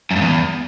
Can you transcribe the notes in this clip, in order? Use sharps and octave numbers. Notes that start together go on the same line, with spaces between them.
F#2
G2
E2